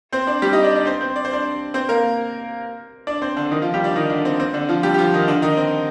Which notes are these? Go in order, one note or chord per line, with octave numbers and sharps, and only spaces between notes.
C4 C5
D4 D5
G3 G4
D#4 D#5
D4 D5
D4 D5
C4 C5
C4 C5
D5
C5
D4 D5
C4 C5
A#3 A#4
D4 D5
C4 C5
D3 D4
D#3 D#4
F3 F4
G3 G4
D4 D5
D#3 D#4
D3 D4
C4
C4
D3 D4
F3 F4
G3 G4
G4
F3 F4
D#3 D#4
D3 D4
D#3 D#4
C4